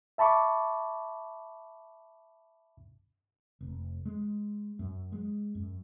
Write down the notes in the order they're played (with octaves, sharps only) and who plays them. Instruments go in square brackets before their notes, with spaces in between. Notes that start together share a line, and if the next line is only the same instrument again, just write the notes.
[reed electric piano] E5 A5 B5 C#6 D6
[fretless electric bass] F1
G#3
F#2
G#3
F#2